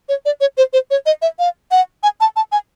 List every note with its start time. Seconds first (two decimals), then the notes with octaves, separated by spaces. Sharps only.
0.09 C#5
0.25 D5
0.41 C#5
0.58 C5
0.73 C5
0.91 C#5
1.06 D#5
1.22 E5
1.39 F5
1.71 F#5
2.03 G#5
2.21 A5
2.36 A5
2.52 G#5